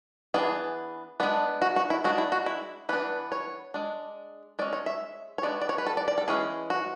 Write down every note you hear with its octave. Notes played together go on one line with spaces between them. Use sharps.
E3 B3 D4 G#4
G#3 B3 D4
F#4
F#4
E4
G#3 D4 F#4
E4
F#4
E4
E3 B3 D4 B4
C#5
G#3 D4
G#3 C#4 D5
C#5
E5
C#5
G#3 B3 D4 D5
D5
C#5
B4
A4
D5
D5
A4
E3 G#3 C#4 G#4
F#4